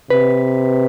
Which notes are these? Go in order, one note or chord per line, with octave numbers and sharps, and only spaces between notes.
C3 B4